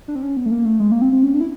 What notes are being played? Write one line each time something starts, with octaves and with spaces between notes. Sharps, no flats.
D4
C4
C#4
B3
A3
A#3
A3
G#3
A#3
C4
C4
C#4
D4
E4